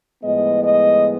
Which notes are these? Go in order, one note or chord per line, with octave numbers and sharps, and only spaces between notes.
A2 F3 G#3 B3 D#5
D#5